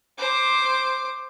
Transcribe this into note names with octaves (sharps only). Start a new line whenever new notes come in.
C5 D6